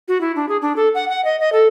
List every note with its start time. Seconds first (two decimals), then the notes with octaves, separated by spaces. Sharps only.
0.08 F#4
0.21 E4
0.36 D4
0.49 G#4
0.62 D4
0.76 A4
0.95 F#5
1.09 F#5
1.25 D#5
1.40 D#5
1.53 A4